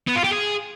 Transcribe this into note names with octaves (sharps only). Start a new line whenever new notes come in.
B3
F4
G4
G#4